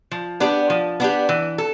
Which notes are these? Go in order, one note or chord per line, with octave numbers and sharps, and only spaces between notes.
F3
B3 D4 G4
F3
B3 D4 G4
E3
A4